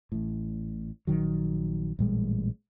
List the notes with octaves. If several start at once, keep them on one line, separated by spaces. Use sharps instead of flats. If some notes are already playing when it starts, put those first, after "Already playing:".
A1 A2
A#1 D#3 F#3
A1 A#2 G3 G#3